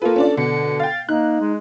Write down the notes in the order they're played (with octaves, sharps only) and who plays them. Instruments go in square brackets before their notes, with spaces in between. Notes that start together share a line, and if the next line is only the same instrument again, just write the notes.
[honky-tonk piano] A#3 B4 [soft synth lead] F4 [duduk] A4
[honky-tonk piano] C#4 D4 D5
[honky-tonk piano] B2 [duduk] D3 [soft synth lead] C#7
[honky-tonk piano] F5 G5 [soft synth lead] A6
[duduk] A#3 [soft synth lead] D#4 [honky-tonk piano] F#6
[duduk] G#3